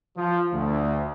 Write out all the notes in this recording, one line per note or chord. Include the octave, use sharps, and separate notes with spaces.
F3
D2